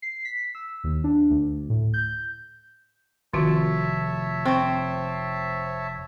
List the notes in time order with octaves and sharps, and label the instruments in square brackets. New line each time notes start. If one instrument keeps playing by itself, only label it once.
[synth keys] C7
B6
E6
D#2
D4
D2
A2
G6
[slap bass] F1 [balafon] D#3 F4 F#4 [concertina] C#5 E5 A5
[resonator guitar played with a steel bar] C4 [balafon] C5 C#6